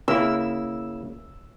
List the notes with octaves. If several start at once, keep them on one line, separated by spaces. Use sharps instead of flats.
C#3 A#3 E4 E6